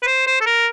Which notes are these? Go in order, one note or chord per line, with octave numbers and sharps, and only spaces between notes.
B4
C5
C5
A4
A#4